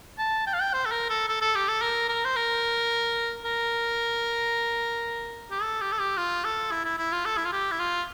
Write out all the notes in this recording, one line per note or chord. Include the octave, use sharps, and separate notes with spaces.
A5
G5
F5
G5
C5
A4
A#4
A4
A4
A4
G4
A4
A#4
A#4
C5
A#4
A#4
G4
A4
G4
A4
G4
F4
A4
E4
E4
E4
F4
A4
E4
F4
G4
E4
F4